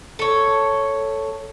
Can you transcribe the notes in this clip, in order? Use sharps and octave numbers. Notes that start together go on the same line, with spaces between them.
A4 C#5